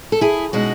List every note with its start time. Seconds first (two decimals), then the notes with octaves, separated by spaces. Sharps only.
0.12 A4
0.21 E4 G#4
0.53 B2 G#3 C#4 D#4 F#4